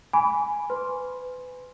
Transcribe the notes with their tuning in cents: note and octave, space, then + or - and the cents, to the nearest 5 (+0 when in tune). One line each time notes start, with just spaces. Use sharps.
G#5 +0 B5 +0 D6 -40
B4 +30 C6 +10